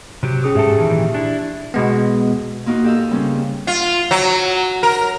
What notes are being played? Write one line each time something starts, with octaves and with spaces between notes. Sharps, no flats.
C3 F#3 G4
C#4 G#4 D#6
G#2 G4 A4 E5
A#2 D#3 E3
D4 E4
B2 G#3 B3
A#2 A#3 D#4 F#4
G4 A4 D#5 F5 E6
C#3 G3 A#3 C4 C#4
F4
F#3
A#4